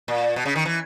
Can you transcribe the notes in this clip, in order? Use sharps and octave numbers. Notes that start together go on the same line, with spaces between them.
A#2
B2
C#3
D#3
E3